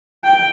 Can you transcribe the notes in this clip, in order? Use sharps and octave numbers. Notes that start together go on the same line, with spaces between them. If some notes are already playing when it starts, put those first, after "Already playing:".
G5